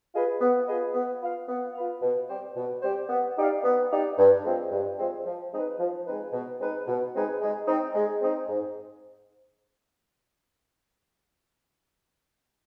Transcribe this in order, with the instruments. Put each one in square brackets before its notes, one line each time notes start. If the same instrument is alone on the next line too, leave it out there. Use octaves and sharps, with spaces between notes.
[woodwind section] F4 G#4 B4 D#5
B3
F4 G#4 B4 D#5
B3
F4 B4 F5
B3
F4 B4 F5
B2
G3 C4 G4 C5
B2
G3 C4 G4 C5
B3
D#4 G4 D5 F5
B3
D#4 G4 D5 F5
G2
F3 G#3 C4
G2
F3 G#3 C4
F3
G#3 C4 D#4 B4
F3
G#3 C4 D#4 B4
B2
G#3 C4 D#4 B4
B2
G#3 C4 D#4 B4
G#3
C4 D#4
G#3
C4 D#4
G#2